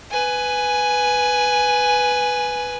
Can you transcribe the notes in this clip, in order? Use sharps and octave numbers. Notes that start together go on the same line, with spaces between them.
B4 G#5